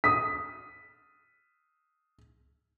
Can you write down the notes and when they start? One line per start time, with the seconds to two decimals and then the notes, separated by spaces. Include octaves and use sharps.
0.04 D#6 B6